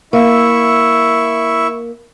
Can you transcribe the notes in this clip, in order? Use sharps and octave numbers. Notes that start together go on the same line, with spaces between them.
A#3 E4 E5 C#6